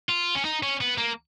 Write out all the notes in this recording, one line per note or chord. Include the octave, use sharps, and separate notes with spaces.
F4
C#4
D#4
C#4
B3
A#3